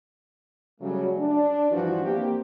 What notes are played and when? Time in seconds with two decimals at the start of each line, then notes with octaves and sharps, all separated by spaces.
0.81 C#3 F#3 G3 A3
1.19 D4
1.71 G2 E3 F3 F#4
2.03 A#3 C4 G4